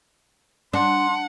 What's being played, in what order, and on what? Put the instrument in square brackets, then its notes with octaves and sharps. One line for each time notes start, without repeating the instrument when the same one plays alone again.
[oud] D4 [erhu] F#5 [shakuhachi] C6